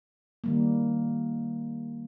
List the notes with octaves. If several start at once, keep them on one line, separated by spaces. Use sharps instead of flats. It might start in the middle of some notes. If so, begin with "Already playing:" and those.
D#3 G3 A#3